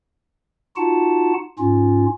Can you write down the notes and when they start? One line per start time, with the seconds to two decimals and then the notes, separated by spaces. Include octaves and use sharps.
0.77 D#4 F4 F#4 F#5 A5
1.59 G#2 C#4 F4